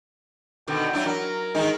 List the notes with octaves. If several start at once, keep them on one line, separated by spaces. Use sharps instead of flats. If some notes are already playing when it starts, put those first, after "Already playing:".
B2 D3 D#3 G5
F#3 D4 E4
F#3 A#4
D#3 G#3 D#4